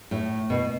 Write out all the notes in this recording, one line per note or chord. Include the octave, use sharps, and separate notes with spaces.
A2
B2